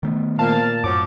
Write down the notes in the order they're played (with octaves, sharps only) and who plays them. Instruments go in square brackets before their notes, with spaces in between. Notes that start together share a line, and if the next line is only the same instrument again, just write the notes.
[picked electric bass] D#3 A3 B3
[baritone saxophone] A#2 [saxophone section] A#3 C4 F5 [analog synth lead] A5
[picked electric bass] F#2 A2 [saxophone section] F3 F#3 [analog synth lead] D6